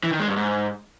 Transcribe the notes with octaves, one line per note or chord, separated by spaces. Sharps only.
E3
D#3
G#3
G2
G#2